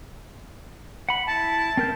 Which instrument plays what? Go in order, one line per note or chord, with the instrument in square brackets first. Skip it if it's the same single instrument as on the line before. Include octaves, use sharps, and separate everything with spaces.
[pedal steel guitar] F#5 B5
[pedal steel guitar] E4 [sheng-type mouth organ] A5
[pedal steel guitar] C4 A#4 G6